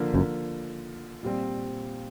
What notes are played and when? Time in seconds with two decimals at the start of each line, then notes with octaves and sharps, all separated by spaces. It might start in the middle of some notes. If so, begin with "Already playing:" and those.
Already playing: D3 F3 A#3
0.14 F#1 F#2
1.23 A#2 G3 C4